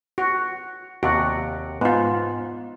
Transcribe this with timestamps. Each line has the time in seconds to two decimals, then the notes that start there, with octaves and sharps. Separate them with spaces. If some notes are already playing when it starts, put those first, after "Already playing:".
0.18 F#4
1.03 D#2 C3 F#4 D5
1.81 G#2 B3 F4